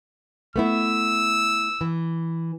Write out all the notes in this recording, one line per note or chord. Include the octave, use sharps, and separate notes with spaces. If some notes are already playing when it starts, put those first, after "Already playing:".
A3 B3 E4 E6
E3